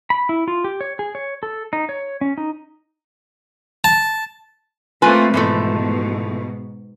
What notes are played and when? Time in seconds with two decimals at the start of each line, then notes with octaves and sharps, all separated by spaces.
0.10 B5
0.29 E4
0.48 F4
0.64 G4
0.81 C#5
0.99 G#4
1.15 C#5
1.43 A4
1.73 D#4
1.89 C#5
2.21 C#4
2.38 D#4
3.84 A5
5.02 A3 A#3 C4 F4 B4 G#5
5.34 G#2 B2 E3 F3 A3